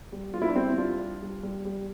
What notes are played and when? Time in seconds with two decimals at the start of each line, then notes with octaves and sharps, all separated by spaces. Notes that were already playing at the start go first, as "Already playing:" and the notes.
0.12 G3
0.34 G3 F4
0.42 E4
0.49 D4
0.56 G3 C4 E4
0.78 G3 D4 F4
0.99 G3
1.22 G3
1.43 G3
1.65 G3